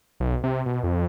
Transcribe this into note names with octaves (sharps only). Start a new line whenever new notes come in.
B1
C3
B2
F2